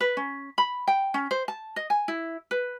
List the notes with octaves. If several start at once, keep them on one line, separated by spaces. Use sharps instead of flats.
B4
C#4
B5
G5
C#4
C5
A5
D#5
G#5
E4
B4